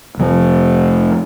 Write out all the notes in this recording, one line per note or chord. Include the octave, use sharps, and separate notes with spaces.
F1 F3